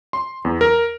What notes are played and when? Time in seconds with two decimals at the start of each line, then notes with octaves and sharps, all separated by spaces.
0.13 C6
0.45 E2
0.61 A#4